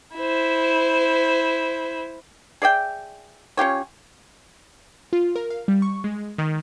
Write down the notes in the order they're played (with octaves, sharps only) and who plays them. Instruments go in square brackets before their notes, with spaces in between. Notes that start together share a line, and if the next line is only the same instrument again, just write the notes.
[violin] E4 C5
[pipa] G#4 D5 E5 G5
C#4 F4 G4 C#5
[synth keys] F4
A#4
F5
G3
C#6
G#3
D#3